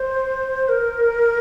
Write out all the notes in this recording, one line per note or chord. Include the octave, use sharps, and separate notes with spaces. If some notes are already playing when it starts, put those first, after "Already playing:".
Already playing: C5
A#4